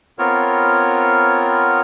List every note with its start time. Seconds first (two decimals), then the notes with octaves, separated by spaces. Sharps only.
0.19 B3 C4 F4 A#4 C#5